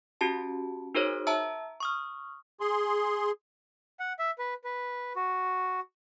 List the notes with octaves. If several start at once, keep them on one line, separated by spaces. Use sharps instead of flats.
C#4 F#4 G4 A5
D#4 F#4 G#4 A#4 C5 C#5
E5 A5 A#5 E6
C#6 D#6 F6
G#4 C6
F#5
E5
B4
B4
F#4